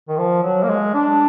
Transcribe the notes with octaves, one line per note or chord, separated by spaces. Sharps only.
D#3
F3
F#3
A#3
G#3
D4